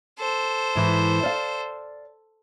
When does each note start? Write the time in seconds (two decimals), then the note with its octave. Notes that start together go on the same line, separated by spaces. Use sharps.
0.18 A4 C5
0.75 G#2 E3
1.23 D5 F5